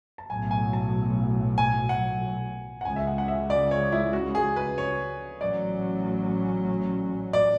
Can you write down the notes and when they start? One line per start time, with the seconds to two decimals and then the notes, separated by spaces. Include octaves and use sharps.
0.18 A5
0.30 B1 A2 F#3 G#5
0.51 G#5
0.73 A5
1.58 G#5
1.89 F#5
2.81 F#5
2.85 C#2 C#3 G#3 G#5
2.96 E5
3.07 F#5
3.18 F#5
3.28 E5
3.50 D5
3.71 C#5
3.92 E4
4.13 F#4
4.35 G#4
4.56 B4
4.78 C#5
5.41 A1 A2 F#3 C#4 D5
7.33 D5